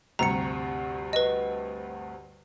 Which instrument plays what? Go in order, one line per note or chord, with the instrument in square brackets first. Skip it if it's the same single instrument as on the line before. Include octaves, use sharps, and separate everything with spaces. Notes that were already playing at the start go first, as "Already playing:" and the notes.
[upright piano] D2 G2 C3 [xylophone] A#5 C#7
[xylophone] B4 D#5